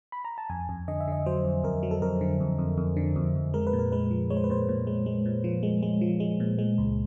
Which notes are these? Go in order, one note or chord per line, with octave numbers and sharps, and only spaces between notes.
B5
A#5
A5
F2 G#5
F2
D3 D#5
E5
D3 D#5
F#3 C5
F2
F2 A#4
F#3
A4
F2 A#4
D3
F2
F2
F2
D3
F2
F2
G#3 A#4
B4
A#2
A#4
G#3 B4
F3
G#3 C#5
C5
B4
A#2 C5
A#2
G#3
G#3
A#2
F3
G#3
G#3
F3
G#3
A#2
G#3
C#2